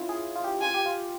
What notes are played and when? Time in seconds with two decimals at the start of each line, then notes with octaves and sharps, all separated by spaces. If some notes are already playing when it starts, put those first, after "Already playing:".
Already playing: C#4 E4 F4
0.09 G#4
0.35 F4
0.44 G4
0.61 F4 G#5
0.74 G4
0.86 F4